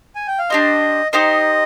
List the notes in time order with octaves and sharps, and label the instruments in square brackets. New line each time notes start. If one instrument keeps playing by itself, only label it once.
[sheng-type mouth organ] G#5
G5
F5
[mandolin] D4 G4 C5 [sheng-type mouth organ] D#5
[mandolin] D#4 G4 C5 [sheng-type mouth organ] D#5